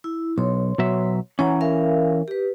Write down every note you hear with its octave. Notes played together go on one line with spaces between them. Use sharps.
E4
B1 C#5 C6
B2 F#3 E5
E3 C#4 C#5 F#5 A#5
A#4 E5 F5
G4 B4